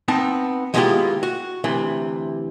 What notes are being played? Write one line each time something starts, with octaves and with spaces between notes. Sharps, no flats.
B3 C4 D#4 A5
D#3 G#3 B3 E4 F4 G4
F#4
D2 C3 E3